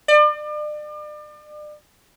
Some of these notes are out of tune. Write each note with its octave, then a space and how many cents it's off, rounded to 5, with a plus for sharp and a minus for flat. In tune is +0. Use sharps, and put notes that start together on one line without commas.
D5 +40